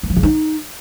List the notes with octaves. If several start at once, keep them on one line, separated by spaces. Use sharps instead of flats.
A#3
F3
C#3
D#4